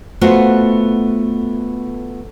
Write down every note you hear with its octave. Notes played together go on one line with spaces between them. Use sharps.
A3 B3 F4 F#4 C5